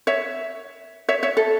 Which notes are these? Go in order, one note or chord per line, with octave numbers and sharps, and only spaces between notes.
C#5 E5
C#5 E5
C#5 E5
A4